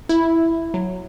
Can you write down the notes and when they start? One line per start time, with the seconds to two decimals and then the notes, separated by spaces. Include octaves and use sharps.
0.09 E4
0.74 F#3